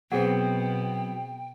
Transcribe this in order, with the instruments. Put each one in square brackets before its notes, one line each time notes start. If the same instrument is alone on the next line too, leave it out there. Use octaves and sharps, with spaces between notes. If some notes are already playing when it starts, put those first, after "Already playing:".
[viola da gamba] B2 [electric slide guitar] F#3 B3 C4 [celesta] G#4 F#5 [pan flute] G5